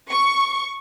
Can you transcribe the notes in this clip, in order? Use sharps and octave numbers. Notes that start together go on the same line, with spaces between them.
C#6